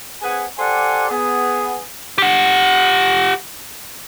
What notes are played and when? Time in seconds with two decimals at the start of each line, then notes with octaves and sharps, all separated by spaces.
0.22 C4 G#4 B4 F#5 G#5
0.58 G4 A4 C5 D5 F#5 G#5
1.10 B3 G#4
2.18 G4 F#5